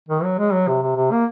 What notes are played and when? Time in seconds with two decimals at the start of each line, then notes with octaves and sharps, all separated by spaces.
0.09 D#3
0.23 F#3
0.39 G#3
0.53 F#3
0.68 C3
0.83 C3
0.96 C3
1.12 A#3